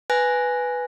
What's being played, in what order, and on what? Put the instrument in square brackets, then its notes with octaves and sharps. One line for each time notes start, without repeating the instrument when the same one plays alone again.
[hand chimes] B4 G#5 F#6 A#6